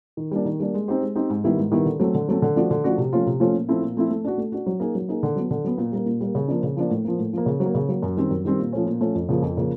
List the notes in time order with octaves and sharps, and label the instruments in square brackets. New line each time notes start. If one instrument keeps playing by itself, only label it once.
[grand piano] D#3
G3 A#3 D4
D#3
G3 A#3 D4
G#3
C4 D#4 G4 C5
G#3
C4 D#4 G4 C5
G#2
D#3 G3 B3 E4
G#2
D#3 G3 B3 E4
D3
F#3 A3 C4
D3
F#3 A3 C4
D3
F3 A3 D4 F#4
D3
F3 A3 D4 F#4
C3
F3 A3 C#4 F4
C3
F3 A3 C#4 F4
A#2
F3 A3 C4 E4
A#2
F3 A3 C4 E4
A3
D4 F#4
A3
D4 F#4
F#3
A#3 D#4 G#4
F#3
A#3 D#4 G#4
D3
F#3 B3
D3
F#3 B3
A#2
G3 A#3
A#2
G3 A#3
C#3
F3 A#3 D4
C#3
F3 A#3 D4
A2
F3 A#3
A2
F3 A#3
C#3
F#3
A#3
C#3
F#3 A#3
F#2
D#3 G3 C4
F#2
D#3 G3 C4
A#2
F3 A3 C#4
A#2
F3 A3 C#4
F2
C#3 F3 A#3
F2
C#3 F3 A#3